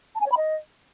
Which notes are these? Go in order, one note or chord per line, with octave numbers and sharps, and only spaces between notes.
A5
G#5
C#5
B5
D#5